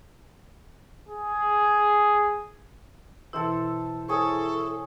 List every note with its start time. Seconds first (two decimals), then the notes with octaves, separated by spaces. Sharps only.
1.09 G#4
3.33 B2 E3 E4 A4 C5
4.08 E4 G#4 A4 C5 C#5